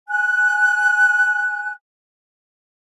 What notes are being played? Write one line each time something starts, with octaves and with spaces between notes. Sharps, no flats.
G#5 F#6